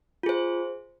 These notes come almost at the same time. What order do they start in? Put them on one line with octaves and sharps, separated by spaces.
F4 G#4 C5